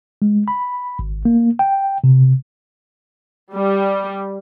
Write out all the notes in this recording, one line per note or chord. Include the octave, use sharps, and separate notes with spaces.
G#3
B5
G#1
A#3
G5
C3
G3